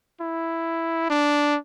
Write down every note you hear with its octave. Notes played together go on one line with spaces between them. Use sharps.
E4
D4